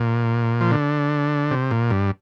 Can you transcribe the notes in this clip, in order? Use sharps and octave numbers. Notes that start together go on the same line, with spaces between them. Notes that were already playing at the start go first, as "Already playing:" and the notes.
Already playing: A#2
F3
D3
C3
A#2
G2